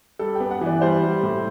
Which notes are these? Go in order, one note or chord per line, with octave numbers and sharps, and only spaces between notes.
G3 A4
G5
B3
F#5
E3 D5
G3 C5
G3
A2